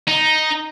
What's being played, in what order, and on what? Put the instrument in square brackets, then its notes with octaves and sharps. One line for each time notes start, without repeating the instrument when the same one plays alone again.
[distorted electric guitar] D#4